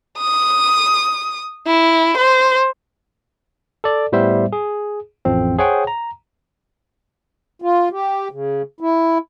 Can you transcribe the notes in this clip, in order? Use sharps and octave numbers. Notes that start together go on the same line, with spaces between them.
D#6
E4
C5
A4 D5
A2 G3 B3 C5 E5
G#4
A1 F2 F3 C4
G#4 C5 C#5 F#5 G5
A#5
F4
G4
C#3
E4